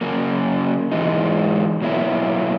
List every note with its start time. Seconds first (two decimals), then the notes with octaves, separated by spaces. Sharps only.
0.01 C#3 F#3 A#3
0.92 G#2 E3 G#3 D#4
1.82 B2 F#3 A#3 E4